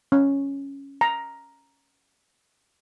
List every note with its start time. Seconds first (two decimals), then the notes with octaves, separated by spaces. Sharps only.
0.12 C#4
1.01 A#5